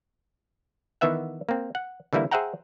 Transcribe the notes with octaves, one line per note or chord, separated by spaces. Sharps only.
D#3 E3 B3 E5 F#5
A#3 C4
F#5
D3 E3 G3 A#3 E4
G#4 C5 E5 F#5 G5 A#5